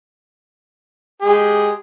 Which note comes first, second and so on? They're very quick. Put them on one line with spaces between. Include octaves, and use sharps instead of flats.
G#4 G#3 G4